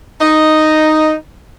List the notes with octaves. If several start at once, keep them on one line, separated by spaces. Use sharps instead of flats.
D#4